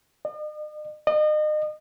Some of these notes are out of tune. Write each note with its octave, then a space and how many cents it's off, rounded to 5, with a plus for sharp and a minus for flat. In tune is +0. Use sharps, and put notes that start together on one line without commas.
D#5 -45
D#5 -35